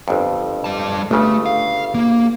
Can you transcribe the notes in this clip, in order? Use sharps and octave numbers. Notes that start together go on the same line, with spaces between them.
G1 F2
G3 A5
G1 C#3 A3
F5
A#3